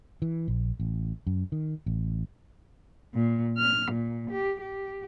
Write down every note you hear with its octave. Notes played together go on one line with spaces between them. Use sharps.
E3
A#1
A1
F#2
D#3
A1
A#2
F6
A#2
G4
G4